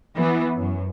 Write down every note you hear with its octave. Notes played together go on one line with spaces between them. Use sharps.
E3 B3
F#2